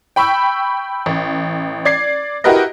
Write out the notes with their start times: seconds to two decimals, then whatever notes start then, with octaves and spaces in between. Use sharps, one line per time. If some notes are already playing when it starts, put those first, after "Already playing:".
0.16 G5 B5 C#6 E6
1.06 A1
1.85 D5 G#6 C7
2.44 E4 F#4 G4 A#4 B4 D#5